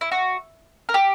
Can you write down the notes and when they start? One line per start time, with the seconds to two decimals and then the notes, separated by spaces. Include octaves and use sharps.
0.01 E4
0.12 F#4
0.89 A#4
0.94 G4